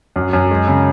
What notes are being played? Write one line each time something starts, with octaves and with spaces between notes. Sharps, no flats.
F#2
F#2
G#3
C#3